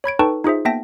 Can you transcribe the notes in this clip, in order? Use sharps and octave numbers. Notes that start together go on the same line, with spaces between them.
C#5 B5 G#6 D7
D#4 A4 B4 G5 A5 C#6
D#4 F4 G#4 C5 E5
A#3 B3 E5 G5 A5 A#6